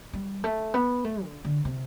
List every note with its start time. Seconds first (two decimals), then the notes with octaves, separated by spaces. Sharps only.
0.14 G3
0.44 A3
0.74 B3
1.04 A3
1.24 D3
1.45 D3
1.65 C3